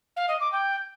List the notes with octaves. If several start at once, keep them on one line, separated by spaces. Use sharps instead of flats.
F5
D#5
D6
G5